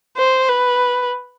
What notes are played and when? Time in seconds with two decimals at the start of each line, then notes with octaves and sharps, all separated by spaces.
0.17 C5
0.49 B4